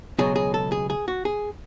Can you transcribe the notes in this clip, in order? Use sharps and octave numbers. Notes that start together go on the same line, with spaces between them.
C#2 B2 F#3 G#4
G#4
A4
G#4
G#4
F#4
G#4